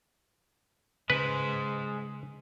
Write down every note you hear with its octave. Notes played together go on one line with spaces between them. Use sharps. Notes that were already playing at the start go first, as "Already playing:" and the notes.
C#3 G#3 B4 C5